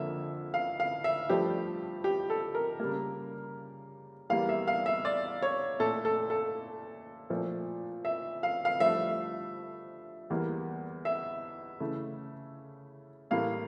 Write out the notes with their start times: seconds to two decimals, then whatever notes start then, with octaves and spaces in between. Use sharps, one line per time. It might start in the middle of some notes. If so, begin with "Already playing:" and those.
Already playing: F2 D3 F3 A#3 E5
0.54 F5
0.80 F5
1.04 E5
1.29 G2 F3 A3 G4
2.04 G4
2.30 A4
2.55 A#4
2.80 C#3 G3 A#3
4.30 E2 E3 G3 A#3 F5
4.49 E5
4.68 F5
4.86 E5
5.05 D5
5.42 C#5
5.80 A#2 A3 A4
6.05 A4
6.30 A4
7.30 A#2 F3 A3
8.05 E5
8.43 F5
8.65 F5
8.80 G2 F3 A3 E5
10.30 E2 E3 G3 A#3
11.05 E5
11.80 C#3 E3 A3
13.30 A2 E3 G3 A#3 F5